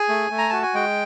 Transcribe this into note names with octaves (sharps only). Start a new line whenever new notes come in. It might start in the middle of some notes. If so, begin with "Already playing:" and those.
Already playing: G#4 G#5
A3
A3
A#5
F#4 A5
G#5
G#3 G5